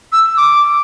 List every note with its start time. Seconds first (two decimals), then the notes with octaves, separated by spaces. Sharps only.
0.13 E6
0.37 D6